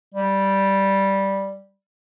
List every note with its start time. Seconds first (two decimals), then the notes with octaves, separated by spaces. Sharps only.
0.14 G3